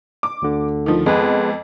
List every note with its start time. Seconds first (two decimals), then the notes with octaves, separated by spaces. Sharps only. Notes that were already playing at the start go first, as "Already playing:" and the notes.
0.23 D6
0.42 D2 D3
0.86 D#3 F3
1.06 F2 G#3 B3 B4